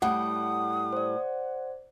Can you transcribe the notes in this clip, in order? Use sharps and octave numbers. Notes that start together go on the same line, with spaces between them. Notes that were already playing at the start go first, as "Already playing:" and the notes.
A2 G3 F#5 D#6
C5 D5